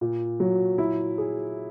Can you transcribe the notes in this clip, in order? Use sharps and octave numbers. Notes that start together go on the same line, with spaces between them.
A#2
F#3
E4
G#4